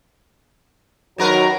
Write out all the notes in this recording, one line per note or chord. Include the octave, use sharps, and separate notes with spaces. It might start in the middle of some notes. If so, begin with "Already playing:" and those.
F#2 D#3 F#3 A#4 B4